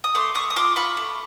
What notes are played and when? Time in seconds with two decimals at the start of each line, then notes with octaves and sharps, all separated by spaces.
0.04 D#6
0.15 A3 C6 D6
0.35 A3 C#6 D#6
0.50 D#6
0.56 F4 C6 D6
0.76 F4 B5 C#6
0.97 A3